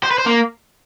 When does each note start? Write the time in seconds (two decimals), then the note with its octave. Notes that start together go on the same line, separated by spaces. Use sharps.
0.03 C5
0.11 B4
0.18 C5
0.26 A#3